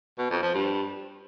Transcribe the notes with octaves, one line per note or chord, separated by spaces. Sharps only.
B2
F2
F3
G2